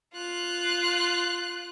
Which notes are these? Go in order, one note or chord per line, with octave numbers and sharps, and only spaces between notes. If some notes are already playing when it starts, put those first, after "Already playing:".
F4 F#6